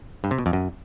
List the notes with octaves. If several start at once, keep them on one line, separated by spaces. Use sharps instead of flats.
G2
C3
B2
F2
F#2